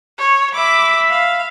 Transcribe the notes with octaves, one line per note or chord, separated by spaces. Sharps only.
C#5
E5 B5 D6
F5